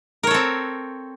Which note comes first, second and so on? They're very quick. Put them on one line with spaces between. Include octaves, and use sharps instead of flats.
A#4 C#5 A4 C4